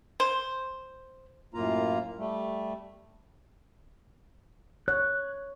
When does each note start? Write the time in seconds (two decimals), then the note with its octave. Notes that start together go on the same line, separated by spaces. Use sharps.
0.20 C5
1.54 F#2 A2 A#3 F4 A#5
2.18 G3 A3
4.88 C#5 F#6